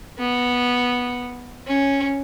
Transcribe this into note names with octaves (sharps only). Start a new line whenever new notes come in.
B3
C#4